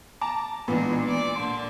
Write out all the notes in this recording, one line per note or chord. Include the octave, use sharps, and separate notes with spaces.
A5 A#5 D6
A#2 E3 G#3 B3 D4 D#4 B5
D5 D6
A#2 D3 A5 C6